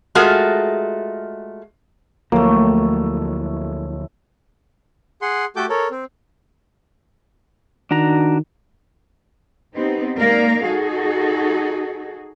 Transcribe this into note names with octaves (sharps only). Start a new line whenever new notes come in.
G#3 A3 F4 F#4 G#4 A#4
D2 A2 F3 F#3 A3 A#3
G#4 F#5 C6
A3 F#4 G4 A4 D6 G6
A4 A#4 C#5
C4
D#3 D4 F#4 A#5
B3 C4 D#4 G4
G#3 A#3 D#4 A#4 D5 F5
D#4 F#4 G#4 A4